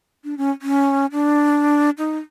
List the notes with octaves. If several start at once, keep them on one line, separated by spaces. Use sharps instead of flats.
D4
C#4
C#4
D4
D#4